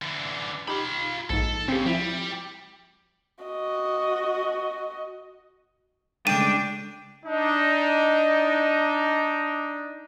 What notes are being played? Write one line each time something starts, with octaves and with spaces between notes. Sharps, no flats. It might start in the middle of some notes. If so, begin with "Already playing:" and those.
D3 E3
D#4 F4 G4 B5
A#1 G#2 A4
A2 C#3 C4 G4
F3 G3 E4
F#4 D#5
C#3 G#3 A3 D4 G5 D#7
D4 D#4